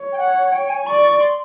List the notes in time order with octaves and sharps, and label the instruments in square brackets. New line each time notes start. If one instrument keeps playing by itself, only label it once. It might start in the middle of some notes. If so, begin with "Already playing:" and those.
Already playing: [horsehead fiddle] C#5
[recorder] G5
F#5
G5
G#5
[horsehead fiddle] D5 [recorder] C#6
[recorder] C6